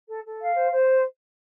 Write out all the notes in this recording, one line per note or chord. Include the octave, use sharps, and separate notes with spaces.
A4
A4
F5
C5
C5